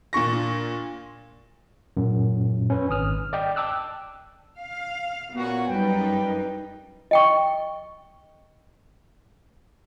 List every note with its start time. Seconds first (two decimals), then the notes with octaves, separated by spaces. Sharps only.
0.13 A#2 D4 C#6 A#6
1.97 F#2 A#2
2.70 C#4 B4
2.90 G#1 D#6 F6
3.33 D5 D#5 G5
3.56 G5 A5 D6 E6 F#6
4.58 F5
5.36 A#2 B3 C#4 F#4
5.69 F#2 G3 D#4 B4 G5
7.11 D#5 G5 C#6